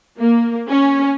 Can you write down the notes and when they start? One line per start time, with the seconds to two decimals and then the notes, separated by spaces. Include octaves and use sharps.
0.18 A#3
0.69 C#4